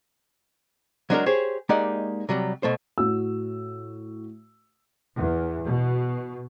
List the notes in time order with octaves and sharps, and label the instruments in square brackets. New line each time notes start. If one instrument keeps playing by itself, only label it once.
[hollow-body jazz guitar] F#3 G#3 D4 F4 F#4 A#4
G4 G#4 C5 C#5
G#3 A#3 D#4 G4 D5 F#5
C3 F#3 G3
B2 A3 C5
[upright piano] A2 F#4 E6
[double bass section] E2
B2